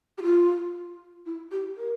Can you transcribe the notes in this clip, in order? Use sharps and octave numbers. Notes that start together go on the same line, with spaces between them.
G4
F4
E4
G4
A#4